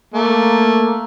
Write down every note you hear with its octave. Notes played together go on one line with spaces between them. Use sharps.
A3 A#3